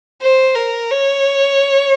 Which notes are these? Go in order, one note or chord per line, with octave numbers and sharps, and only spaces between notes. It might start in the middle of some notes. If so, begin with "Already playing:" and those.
C5
A#4
C#5